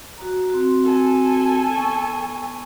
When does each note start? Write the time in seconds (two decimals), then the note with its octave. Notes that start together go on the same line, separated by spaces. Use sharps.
0.18 F#4 A#5
0.50 C4 F#4
0.84 A4 G#5
1.75 B3 C#6